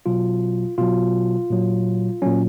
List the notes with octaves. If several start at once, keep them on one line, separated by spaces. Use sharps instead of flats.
B2 F#3 F4
B2 F#3 F4
A#2 F#3
A#2 F#3 C#4